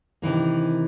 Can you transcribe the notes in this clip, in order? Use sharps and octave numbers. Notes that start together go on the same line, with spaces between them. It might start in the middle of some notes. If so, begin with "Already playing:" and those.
C3 D#3 E3 A#3